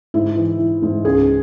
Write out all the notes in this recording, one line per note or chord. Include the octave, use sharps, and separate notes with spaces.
G#2 E4
E3
E3
G#2
C#2 G#4